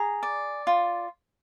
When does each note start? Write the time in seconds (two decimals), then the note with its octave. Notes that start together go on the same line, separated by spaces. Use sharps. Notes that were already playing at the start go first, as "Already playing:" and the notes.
Already playing: G#4 A#5
0.23 D5
0.67 F4